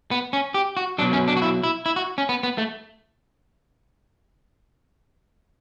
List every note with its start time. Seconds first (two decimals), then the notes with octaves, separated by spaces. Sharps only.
0.11 B3
0.33 C#4
0.54 G4
0.77 F#4
0.98 F#3 D4
1.02 B2
1.13 C#4
1.28 D4
1.37 F#4
1.42 E4
1.64 E4
1.86 E4
1.96 F#4
2.18 C#4
2.29 B3
2.43 B3
2.58 A3